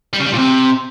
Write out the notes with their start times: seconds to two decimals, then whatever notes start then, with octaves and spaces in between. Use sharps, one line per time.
0.13 G3
0.20 C#3
0.26 G3
0.32 A#2
0.38 C3